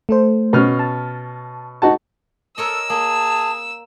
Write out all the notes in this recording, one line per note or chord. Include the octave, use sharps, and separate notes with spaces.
A3 A4 C5
B2 C#4 F6
A5
D#4 F#4 A5
A4 A#4 C#5 D#5 E6
A#3 G#4 A5